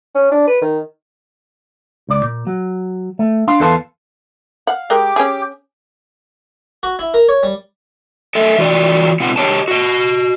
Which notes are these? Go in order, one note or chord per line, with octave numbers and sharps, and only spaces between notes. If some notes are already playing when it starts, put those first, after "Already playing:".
C#4
D4
B4
D#3
C#2 D5
A#2
F#3
A3
D4 F5 C6
E2 A4 B4 F5 A5 C6
F5 F#5
G#3 G4 A#4 D#5 G5 D6
C#4 G#4
F#4
E4
A#4
C#5
G3
A4 D#5 E5
E3 F4 F#4 D5
B2 C4 F4 F#5
G4 C#5 D#5 A5
F#4 D#5